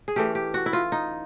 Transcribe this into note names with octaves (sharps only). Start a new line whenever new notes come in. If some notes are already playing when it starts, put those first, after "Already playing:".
G#4
E3 A3 C#4 G4
G4
F#4
E4
F4
D#4